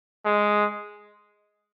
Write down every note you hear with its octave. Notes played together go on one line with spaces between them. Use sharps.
G#3